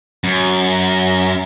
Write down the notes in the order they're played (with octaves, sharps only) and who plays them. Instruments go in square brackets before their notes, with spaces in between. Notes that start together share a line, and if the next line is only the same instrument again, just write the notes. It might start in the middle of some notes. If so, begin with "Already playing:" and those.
[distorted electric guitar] F#2